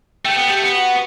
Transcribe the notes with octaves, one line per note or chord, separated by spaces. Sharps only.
A3 G4
B3
A3 G4
B3
F#4